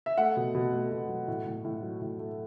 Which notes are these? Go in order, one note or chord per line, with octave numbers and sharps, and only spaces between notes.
E5
A3 F#5
B2
B2
A3
B2
F#3
A2
A2
A2
F#3
A2
A3